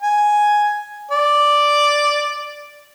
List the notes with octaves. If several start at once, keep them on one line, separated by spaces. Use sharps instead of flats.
G#5
D5